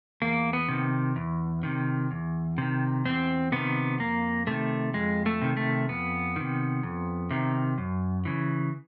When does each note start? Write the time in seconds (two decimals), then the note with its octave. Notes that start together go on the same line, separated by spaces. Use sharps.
0.22 E2 A#3
0.53 B3
0.69 C3 D#3
1.16 E2
1.63 C3 D#3
2.11 E2
2.58 C3 D#3
3.05 E2 C4
3.52 C3 D#3 B3
4.00 F2 A#3
4.47 C3 D#3 A3
4.94 F2 G#3
5.26 A3
5.42 C3 D#3
5.57 A3
5.89 F2 B3
6.36 C3 D#3
6.83 F2
7.31 C3 D#3
7.78 F#2
8.25 C#3 E3